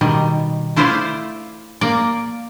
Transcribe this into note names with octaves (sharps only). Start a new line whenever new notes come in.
B2 D#3 G3
A3 E4 F4 C5 D5 F5
A#3 D5